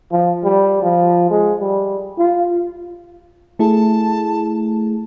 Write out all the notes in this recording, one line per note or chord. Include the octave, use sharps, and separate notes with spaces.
F3
G3
F3
G#3
G3
F4
A3 E4 G#4 A5